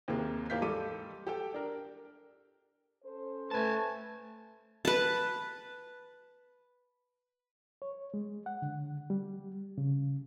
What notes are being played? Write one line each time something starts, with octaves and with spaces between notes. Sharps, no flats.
D#2 C3 A#3 G#4
D#2 A#3 F5 G6 B6
G#2 G3 A4 D6 D#7
G4 A4 G5
D4 A#4
C#4 A4 C5
A3 B4 G#5 A5
B4 A5
C#5
G#3
F#5
D3
G3
C#3